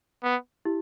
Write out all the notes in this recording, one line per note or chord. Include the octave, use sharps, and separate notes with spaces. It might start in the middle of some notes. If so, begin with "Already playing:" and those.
B3
E4 G4